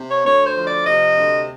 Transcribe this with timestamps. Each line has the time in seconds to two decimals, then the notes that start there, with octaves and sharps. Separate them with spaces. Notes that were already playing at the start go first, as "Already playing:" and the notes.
Already playing: C3
0.09 C#5
0.24 D2 C#5
0.45 C5
0.55 F3
0.64 D5
0.85 C3 D#5
1.15 D2